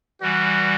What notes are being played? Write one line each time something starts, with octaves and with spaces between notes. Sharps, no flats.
E3 G3 F#4